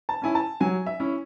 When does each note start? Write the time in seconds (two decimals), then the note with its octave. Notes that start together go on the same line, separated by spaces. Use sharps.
0.09 A5
0.22 C#4 E4 G#5
0.35 A5
0.61 F#3 G#5
0.86 E5
1.00 C#4 E4